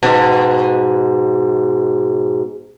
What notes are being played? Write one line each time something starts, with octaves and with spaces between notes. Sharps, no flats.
G#2 B2